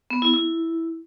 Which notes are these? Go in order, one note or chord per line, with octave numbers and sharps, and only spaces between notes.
B3
E4
E4